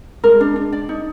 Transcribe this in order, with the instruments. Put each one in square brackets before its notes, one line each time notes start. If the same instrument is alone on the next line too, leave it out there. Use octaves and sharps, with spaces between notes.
[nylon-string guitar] G#3 [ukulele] A#4
[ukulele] D4
D4
D5
D#4